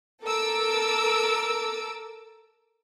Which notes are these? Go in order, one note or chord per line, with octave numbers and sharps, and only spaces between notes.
A4 A#4 D6 E6 D7